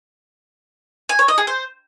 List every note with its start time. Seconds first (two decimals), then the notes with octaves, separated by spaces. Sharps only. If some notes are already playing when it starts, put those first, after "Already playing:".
1.09 G#5
1.19 C#5
1.28 D#5
1.38 G#4
1.47 C5